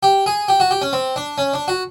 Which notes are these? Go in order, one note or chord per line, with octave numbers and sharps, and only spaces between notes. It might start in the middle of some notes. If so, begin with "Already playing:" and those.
G4
G#4
G4
F#4
G4
C#4
C4
D4
C#4
D4
F#4